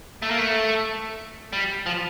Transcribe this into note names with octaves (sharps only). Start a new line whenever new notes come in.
A3
A#3
A3
G3
F3